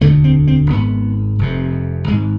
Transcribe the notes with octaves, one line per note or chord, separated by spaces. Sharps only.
E1 D2 D3 A3
C4
C4
G#1 G#2 B3
F1 F2 C3
G#1 G#2 G#3